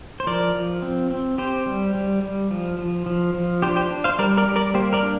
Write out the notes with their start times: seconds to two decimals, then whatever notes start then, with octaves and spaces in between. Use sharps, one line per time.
0.20 C5
0.27 F3 A#4 D5
0.55 F3
0.82 C4
1.10 C4
1.38 C4 G4 C5
1.67 G3
1.95 G3
2.23 G3
2.51 F3
2.79 F3
3.06 F3
3.34 F3
3.62 D4 G4 C5
3.76 G4 C5
3.90 D4
4.04 C5 F5
4.19 G3 A#4 D5
4.37 A#4 D5
4.46 G3
4.56 A#4 D5
4.74 A#3 G4 C5
4.93 A#4 D5
5.02 D4